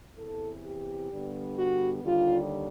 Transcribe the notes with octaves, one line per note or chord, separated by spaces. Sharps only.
E2 C3 E3 A4
G4
G2 D3 G3 B3
F#4
D#2 D3 G3 F4